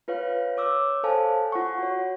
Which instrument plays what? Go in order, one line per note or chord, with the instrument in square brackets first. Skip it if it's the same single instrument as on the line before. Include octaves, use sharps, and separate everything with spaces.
[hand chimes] F4 B4 C#5 F5
C#5 D6 E6
A4 C5 C#5 F5 G#5 A5
F4 F#5 C#6
F#4 C#5